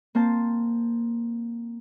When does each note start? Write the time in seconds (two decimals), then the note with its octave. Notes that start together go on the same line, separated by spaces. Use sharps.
0.15 A#3 C4 C5 A5